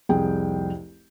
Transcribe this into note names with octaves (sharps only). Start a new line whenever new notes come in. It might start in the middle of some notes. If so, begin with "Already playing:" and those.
F1 C2 G#4 G5